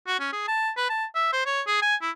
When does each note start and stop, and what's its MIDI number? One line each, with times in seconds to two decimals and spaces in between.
0.07 0.17 66
0.20 0.30 61
0.33 0.48 68
0.48 0.70 81
0.77 0.88 71
0.89 1.05 81
1.15 1.30 76
1.33 1.43 72
1.46 1.61 73
1.67 1.81 68
1.82 1.96 80
2.02 2.10 64